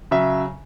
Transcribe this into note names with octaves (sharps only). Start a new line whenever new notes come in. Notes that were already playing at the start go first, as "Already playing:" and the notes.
C#3 F#3 E5